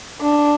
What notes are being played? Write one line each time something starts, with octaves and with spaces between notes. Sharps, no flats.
D4